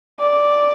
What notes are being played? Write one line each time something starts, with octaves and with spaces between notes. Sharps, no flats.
D5